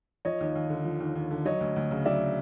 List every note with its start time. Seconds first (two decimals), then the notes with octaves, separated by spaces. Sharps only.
0.25 F3 C#5 D#5
0.41 D#2
0.55 D#2
0.70 D3
0.85 F3
1.00 D#2
1.15 D#2
1.31 D3
1.45 F#3 C#5 D#5
1.61 D2
1.76 D2
1.91 C#3
2.05 F#3 D5 E5